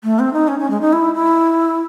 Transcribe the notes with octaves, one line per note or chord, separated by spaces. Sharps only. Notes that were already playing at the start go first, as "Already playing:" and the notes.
A3
C4
D#4
C#4
C#4
G#3
D#4
E4
E4